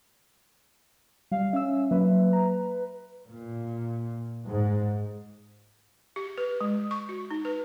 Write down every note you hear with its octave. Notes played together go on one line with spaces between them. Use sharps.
G3 F5
C#4 E5 E6
F#3 A#3 B4 E5
A#5
A#2
G#2
G4
B4
G#3
C#6
F#4
D#4
B4